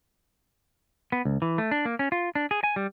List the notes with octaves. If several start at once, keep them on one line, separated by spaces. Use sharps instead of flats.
B3
C#2
E3
A3
D4
A#3
C#4
F4
D4
G#4
G#5
G3